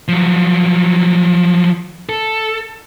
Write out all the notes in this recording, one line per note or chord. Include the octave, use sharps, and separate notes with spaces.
F3 F#3
A4